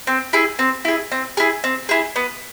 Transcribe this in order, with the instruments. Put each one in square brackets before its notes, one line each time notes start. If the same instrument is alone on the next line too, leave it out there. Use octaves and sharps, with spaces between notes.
[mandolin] C4
E4 G#4
C4
E4 G#4
C4
E4 G#4
C4
E4 G#4
B3